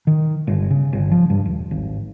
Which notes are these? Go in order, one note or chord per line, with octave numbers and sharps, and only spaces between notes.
D#3
G1
C#3
G1
F3
G2
D#1
G#1